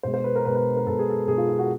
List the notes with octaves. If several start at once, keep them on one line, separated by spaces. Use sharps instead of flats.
B2 G#3 C5
C5
B4
A#4
B2 G#3 B4
B4
A#4
B2 G#3 A4
G#4
A4
B2 G#3 G#4
F4
F4
F#4